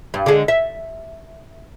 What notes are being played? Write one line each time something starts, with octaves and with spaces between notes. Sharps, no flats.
G2
D3 G#3
E5